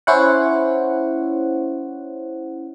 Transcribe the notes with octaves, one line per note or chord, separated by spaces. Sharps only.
C#4 E4 C5 C#5 F#5